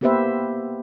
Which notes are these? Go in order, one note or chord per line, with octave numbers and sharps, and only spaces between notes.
A#3 B3 G4 B4 C5 E5